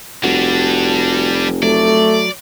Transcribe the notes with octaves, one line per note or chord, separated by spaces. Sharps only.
F1 G3 D4 F#4
F#3 A3 D5